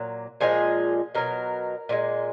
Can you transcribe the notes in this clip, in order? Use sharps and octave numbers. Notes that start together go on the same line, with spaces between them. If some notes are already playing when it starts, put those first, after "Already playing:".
Already playing: A#2 F#3
A#2 F3 G#3 G#4
B2 F#3 A#4
A#2 F3 G#3